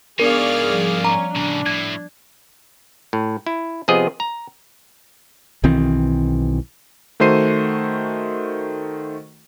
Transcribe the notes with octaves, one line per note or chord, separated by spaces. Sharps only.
G#2 B3 D4 G#4 A#4 C#5 D5 F5
F3 G3
C#4 D5 A#5 D6
A2 C#3 D4
A2 G#6
A2
E4
C3 F3 B3 G#4 D#5
A#5
B1 D#3 E3 C4
D#3 A3 F#4 C5 C7 D#7